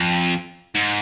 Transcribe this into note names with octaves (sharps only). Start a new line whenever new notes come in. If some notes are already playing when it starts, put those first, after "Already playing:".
Already playing: F2
G#2